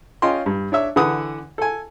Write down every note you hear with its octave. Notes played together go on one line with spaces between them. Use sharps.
C#4 F4 D#5 G5 C6
G2
D4 C#5 E5
D3 E3 B4 F#5 D#6
A4 G#5